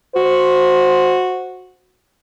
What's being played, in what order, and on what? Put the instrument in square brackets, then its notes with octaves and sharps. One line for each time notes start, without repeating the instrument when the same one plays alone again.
[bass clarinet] F#4 [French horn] C5